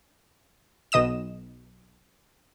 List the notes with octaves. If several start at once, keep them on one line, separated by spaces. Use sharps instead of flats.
B1 B2 D#5 D#6 E7